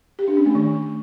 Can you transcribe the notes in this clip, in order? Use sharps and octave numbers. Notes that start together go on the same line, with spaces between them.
G4
D4
C#4
A3
D#3